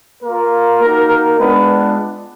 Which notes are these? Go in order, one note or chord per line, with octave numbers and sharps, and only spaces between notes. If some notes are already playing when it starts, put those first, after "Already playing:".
A#3 F4 A#4
A#3 D#4 F#4 A#4
A#4
G#3 B3 D4 F4 B4